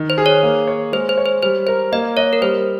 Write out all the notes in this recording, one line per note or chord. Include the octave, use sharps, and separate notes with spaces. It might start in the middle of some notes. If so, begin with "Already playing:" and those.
Already playing: D#3
C5
G#4
C#5
A#3
C#5
G#3 C5
C5
C#5
C5
G3 C5
A#4 C5
A#3 D#5
C#5 D#5
A#4
G3 C5